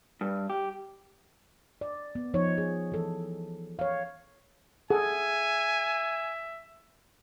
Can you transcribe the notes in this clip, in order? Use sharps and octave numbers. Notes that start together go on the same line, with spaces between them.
G2
G4
D5
B3
F3 D#4 C5 C#5
G#4
E3 A4
C#5 F5
G#4 A4 E5 F#5 G#5